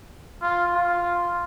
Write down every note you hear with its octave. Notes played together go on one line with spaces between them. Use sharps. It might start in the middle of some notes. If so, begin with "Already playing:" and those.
F4
F4